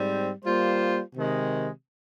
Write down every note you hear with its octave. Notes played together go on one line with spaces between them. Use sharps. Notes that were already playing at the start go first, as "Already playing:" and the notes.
Already playing: G#2 G3 C4
G3 A#3 F4 C5
C3 D#3 G#3